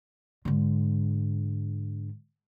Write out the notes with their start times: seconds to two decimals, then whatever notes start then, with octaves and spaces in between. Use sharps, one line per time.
0.45 G#2 D3